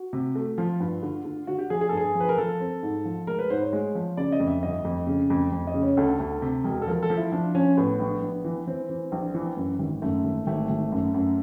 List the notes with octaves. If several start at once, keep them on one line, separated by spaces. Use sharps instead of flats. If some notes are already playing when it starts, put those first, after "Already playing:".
Already playing: F#4
C3
A3
F3 F4
G2
D3
D3
D3 F#4
G4
F3 G#4
G#4
A4
G2 G#4
F3
B4
A#4
F3 A4
C4
G#2
F3
G#3 A#4
B4
G#2 C5
C#5
G#3
F3
C#3 D5
D#5
F2
E5
G1 D#5
F2
C#3
F2
F2
D#5
C#3
C#5
D2 A4
D2
C3
E1
A4
F3 A#4
A4
F3
E4
F3 D4
F3 C#4
A2 B3
A#1
A#1
E3
E3 C4
E3
A#1
E3
F#2
G#1
F#2 A3
G#1
G#1 A3
G#1
F#2
F#2